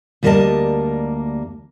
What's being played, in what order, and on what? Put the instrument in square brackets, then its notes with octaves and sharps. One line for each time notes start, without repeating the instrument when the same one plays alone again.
[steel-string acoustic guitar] D2 G3 A#3 A#4 D#5 A5